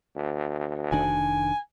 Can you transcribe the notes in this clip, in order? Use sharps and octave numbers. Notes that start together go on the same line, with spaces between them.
D2
F1 D#3 D4 G#5